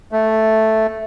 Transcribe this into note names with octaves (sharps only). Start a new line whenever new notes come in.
A3